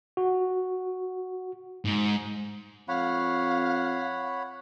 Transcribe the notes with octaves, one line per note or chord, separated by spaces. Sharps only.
F#4
G#2
F2 C#5 F5 F#5 B5